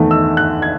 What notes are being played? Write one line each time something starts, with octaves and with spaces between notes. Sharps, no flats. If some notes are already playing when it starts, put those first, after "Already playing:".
Already playing: E2 D#3 A3
E6
F#6
G#6